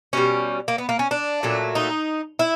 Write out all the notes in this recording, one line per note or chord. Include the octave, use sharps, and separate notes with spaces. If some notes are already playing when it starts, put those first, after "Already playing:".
B2 G3 C#4
A#3
B3
A#3
C#4
D4
A#2 F#3 A3
D#4
E4